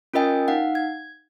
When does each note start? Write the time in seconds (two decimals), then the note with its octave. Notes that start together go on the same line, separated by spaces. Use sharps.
0.14 C#4 F4 A#4 D#5 G5 G#5
0.48 D#4 F5 F#5
0.75 G#6